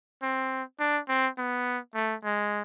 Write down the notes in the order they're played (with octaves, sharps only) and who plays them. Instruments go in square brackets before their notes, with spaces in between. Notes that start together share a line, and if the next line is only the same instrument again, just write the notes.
[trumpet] C4
D4
C4
B3
A3
G#3